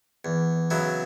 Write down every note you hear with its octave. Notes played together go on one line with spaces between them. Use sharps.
E2
C#3 F#3 B3 E4